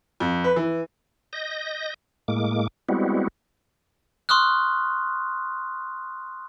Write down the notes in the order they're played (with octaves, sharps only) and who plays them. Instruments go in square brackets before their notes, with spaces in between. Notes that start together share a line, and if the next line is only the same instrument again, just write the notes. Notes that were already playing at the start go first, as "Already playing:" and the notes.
[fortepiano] F2
B4
E3
[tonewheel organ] D#5 G6 A#6
A2 G#3 A#3 D6
G3 G#3 B3 C4 E4 F#4
[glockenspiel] C6 C#6 D#6 F6 F#6